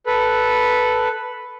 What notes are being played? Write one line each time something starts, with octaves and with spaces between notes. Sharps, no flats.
A4 B4